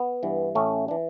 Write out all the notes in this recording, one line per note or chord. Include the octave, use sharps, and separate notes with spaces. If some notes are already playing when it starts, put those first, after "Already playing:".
Already playing: B3
G2 E3
A1 A3 C#4
E3 D4